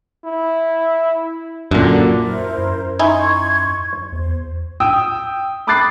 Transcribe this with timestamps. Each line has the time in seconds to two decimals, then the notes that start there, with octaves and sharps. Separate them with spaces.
0.24 E4
1.71 F#2 A#2 D3
2.23 E4 A#4 C5
2.58 F#2
2.99 D#4 E4 G#5 C6 C#6 G#6
4.12 E2 C5
4.80 G5 D#6 E6
5.67 B5 D6 D#6 F#6 A6 C7